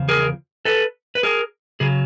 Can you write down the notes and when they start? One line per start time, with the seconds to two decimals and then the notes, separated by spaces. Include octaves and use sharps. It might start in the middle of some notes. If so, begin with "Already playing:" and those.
Already playing: E2 C#3 F3
0.09 G#4 A#4
0.65 A4 B4
1.15 B4
1.23 G#4 A#4
1.80 C#3 F#3 G#4